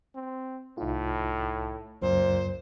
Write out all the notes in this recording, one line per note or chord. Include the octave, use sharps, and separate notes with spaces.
C4
C2 A2 D#4 F4
C#2 F#2 A#2 C5